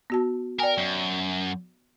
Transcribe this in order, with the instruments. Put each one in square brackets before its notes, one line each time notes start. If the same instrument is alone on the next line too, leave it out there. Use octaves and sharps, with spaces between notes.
[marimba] B3 F#4 A5
[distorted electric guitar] A#4 [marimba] D5 G5 G#5
[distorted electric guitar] F#2